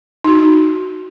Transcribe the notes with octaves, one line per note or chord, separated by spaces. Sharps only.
D#4 F#4